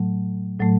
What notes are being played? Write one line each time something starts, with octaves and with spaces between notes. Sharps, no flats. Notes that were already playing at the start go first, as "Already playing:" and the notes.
Already playing: A2 F#3 A3
A2 F#3 A3